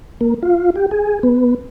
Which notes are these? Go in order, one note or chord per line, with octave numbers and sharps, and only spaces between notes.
A#3
F4
G4
G#4
B3